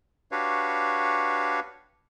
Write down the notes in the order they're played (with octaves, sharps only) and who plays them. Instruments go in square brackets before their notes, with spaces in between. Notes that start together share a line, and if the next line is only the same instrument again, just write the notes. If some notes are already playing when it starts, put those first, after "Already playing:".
[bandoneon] D4 F#4 G4 B4 C#5 F5